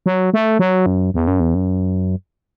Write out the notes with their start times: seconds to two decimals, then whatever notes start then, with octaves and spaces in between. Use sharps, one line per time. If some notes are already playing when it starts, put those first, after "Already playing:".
0.06 F#3
0.34 A3
0.59 F#3
0.86 F#2
1.14 E2
1.27 F#2
1.40 E2
1.55 F#2